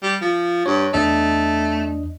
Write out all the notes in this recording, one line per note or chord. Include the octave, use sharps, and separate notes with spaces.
G3
F3
G2 C#5
E2 A3 D4 D#5